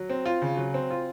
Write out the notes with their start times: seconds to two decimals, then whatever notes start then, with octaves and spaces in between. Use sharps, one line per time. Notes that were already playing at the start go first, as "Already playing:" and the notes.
Already playing: F#3
0.09 C4
0.26 F4
0.42 C#3
0.57 F#3
0.74 C4
0.91 F4